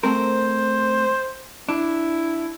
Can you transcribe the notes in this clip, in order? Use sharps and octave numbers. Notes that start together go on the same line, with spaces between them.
A3 C4 A#4 C5
D4 E4